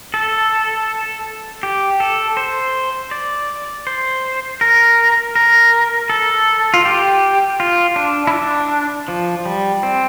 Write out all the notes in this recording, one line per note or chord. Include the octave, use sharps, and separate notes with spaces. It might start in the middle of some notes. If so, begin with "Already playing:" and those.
A4
G4
A4
C5
D5
C5
A#4
A#4
A4
F4
G4
F4
D4
E4
D4
F3
G3
C4